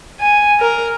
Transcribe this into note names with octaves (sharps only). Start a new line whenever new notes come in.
G#5
A#4